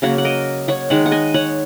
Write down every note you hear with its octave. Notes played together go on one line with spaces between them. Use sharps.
C#3 F#3 A#3 C#5 F#5
F#5
A#4 D#5
C#5 F#5
D#3 G#3 C#5 F#5
F#5
D#5 G#5
C#5 F#5